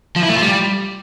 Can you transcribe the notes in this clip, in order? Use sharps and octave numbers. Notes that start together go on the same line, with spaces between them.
F3
E4
A3
F4
G3